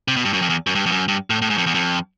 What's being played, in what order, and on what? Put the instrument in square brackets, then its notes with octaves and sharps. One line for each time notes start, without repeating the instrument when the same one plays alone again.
[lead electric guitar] C3
B2
G2
F#2
F2
E2
F#2
G2
F2
F#2
G2
A2
A2
G#2
F2
E2
F2